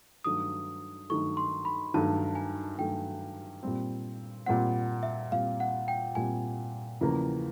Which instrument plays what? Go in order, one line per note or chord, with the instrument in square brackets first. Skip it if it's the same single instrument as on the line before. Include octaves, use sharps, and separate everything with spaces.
[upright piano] G2 D#3 F#3 A3 [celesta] D#6
[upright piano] G2 D#3 F#3 A3 [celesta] C#6
[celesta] C6
B5
[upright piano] G2 D#3 F#3 A3 [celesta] A5
[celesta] G#5
[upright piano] G2 D#3 F#3 A3 [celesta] G5
[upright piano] A#2 G3 C4
[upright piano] A#2 G3 C4 [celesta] F#5
[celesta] E5
[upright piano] A#2 G3 C4 [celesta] F5
[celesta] F#5
G5
[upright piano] A#2 G3 C4 [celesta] G#5
[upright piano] E2 C#3 F3 A#3